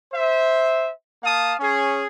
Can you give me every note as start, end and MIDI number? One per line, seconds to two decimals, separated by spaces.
0.13 0.91 72
0.13 0.91 76
1.23 1.53 58
1.23 1.53 77
1.23 1.53 81
1.23 1.53 87
1.60 2.05 61
1.60 2.05 68